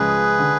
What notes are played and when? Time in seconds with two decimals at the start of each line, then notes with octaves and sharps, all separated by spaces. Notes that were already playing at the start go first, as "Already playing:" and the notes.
Already playing: C#2 C#3 F3 G#3 G#4 B4
0.39 D3